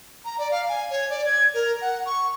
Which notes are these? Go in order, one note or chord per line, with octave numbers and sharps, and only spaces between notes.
A#5
D5
F5
G#5
C#5
D5
G#6
A#4
F#5
C#6